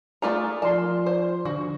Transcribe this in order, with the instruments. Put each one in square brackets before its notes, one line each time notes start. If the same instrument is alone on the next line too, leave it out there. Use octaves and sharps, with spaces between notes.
[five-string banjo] A3 F4 A#5 [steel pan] G#4 D5
[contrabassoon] F3 [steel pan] A#4 C6 [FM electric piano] D5 [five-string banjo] A5
[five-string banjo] C5
[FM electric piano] D3 [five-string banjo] F#4